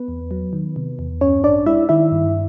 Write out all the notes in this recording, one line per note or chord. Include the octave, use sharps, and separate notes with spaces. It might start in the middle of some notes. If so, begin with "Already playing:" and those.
Already playing: B3 B4
E2
F#3
D#3
C3
E2
G2 C#4 C#5
A1 D4 D5
G#3 E4 E5
D#3 E4 E5
G2